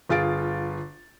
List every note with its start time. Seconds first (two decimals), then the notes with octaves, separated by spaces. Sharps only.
0.09 G1 F4 G#4 A6 D7